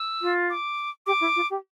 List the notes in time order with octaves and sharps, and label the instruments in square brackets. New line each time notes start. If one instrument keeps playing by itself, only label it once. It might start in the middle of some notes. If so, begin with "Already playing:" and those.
Already playing: [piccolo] E6
[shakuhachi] F4
[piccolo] D6
[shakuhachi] G4 [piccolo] D6
[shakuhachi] E4
F4
G4